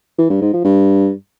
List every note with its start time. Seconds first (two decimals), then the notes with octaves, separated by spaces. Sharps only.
0.18 E3
0.30 G2
0.42 G#2
0.53 F3
0.65 G2